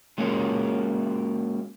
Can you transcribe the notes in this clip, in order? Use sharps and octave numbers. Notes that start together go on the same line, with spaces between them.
F#3 G#3 A#3 C#4